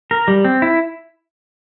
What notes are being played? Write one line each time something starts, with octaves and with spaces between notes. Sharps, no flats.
A#4
G3
C4
E4